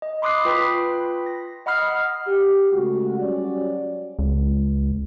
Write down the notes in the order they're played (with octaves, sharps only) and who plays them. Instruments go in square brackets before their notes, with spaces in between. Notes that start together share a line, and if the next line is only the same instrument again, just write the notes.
[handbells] D#5
B5 C6 D6 D#6 F#6 C7
F4 B4 G5 B5 B6
A#6
D#5 F#5 B5 D#6 F6 C7
[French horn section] G4
C#3 G#3 A3 F#4
F#3 G3 C#4 F#4 D5
[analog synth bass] C#2